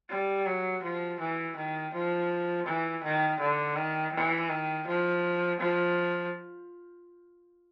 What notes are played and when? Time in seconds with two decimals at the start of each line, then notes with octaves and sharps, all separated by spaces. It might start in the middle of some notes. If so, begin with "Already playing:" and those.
0.10 G3
0.46 F#3
0.83 F3
1.20 E3
1.57 D#3
1.94 F3
2.66 E3
3.04 D#3
3.40 D3
3.76 D#3
4.14 E3
4.50 D#3
4.87 F3
5.60 F3